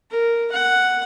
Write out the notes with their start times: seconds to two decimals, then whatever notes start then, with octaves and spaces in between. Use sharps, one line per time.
0.11 A#4
0.52 F#5